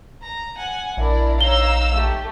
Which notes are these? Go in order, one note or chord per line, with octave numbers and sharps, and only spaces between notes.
A#5
F#5 G#5
A#1 D4 E4 A#4 D5
D#4 C#5 F5 A#5 E6 G7
A3 G4